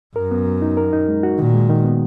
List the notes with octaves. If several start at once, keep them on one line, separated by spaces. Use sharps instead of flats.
F#2 A#4
B3
F#3
D#4
A#4
D#4
G#3
F#4
A#2 D#3
G#3
D#3
B3